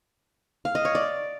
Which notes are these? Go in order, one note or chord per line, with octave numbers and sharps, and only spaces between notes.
F5
D#5
C#5
D5